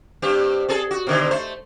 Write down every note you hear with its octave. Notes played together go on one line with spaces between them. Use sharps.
G2 C4 G4
C4 G#4 A4
F#4
B2 D3 D#3
A3 C5